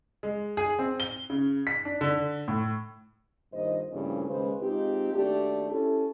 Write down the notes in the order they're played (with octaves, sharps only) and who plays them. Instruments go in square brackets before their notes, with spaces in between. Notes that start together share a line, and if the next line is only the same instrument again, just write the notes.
[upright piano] G#3
G#4
C4
G7
C#3
B6
D4
D3
A2
[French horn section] G2 A#2 D#3 C5 D#5
G2 A#2 C#3 E3 A3 C4
D#2 C#3 G#3 A#3 B4 C5
G#3 C4 D#4 F4 G4
D#2 A3 D4 F#4 G4
C#4 E4 G4 A4